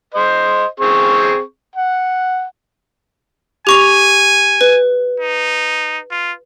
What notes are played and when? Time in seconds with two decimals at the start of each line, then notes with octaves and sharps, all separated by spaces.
0.15 C5 D#5
0.80 C4 G#4 C#6
1.76 F#5
3.67 G4 G#5 C#6 F7
4.61 B4
5.20 D#4
6.11 F4